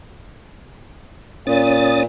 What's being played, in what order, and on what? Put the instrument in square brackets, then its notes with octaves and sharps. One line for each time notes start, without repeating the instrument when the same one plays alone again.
[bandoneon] A#2 [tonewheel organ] C#4 D#6 A6